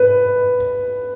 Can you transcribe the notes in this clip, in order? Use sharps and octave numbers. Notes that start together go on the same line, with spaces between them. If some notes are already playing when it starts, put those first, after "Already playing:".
Already playing: B4